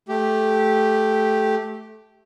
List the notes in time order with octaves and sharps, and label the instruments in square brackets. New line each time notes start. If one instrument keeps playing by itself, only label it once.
[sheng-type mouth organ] A3 G4